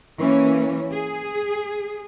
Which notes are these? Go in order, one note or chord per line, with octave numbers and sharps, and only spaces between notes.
E3 A#3 C#4
G#4